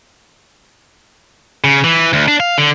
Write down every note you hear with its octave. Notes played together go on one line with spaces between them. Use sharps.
C#3
E3
D2
D4
F5
D3